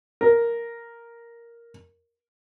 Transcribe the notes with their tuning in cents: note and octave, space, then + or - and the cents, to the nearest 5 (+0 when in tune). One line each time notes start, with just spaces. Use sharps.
A#4 +0